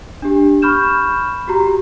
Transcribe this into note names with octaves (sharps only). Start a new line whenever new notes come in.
D4 G4
B5 C#6 F6 G6 E7
F#4 G4 A#5